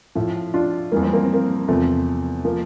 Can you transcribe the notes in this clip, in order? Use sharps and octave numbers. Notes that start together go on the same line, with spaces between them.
A2 F3
D4 F4
F2 E3 G3 A#3
C4
A#3
C4
A#3
E2 C3 F3 A3 C4
F3 A#3